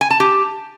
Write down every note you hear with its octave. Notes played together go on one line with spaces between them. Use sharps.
G#5
A5
G4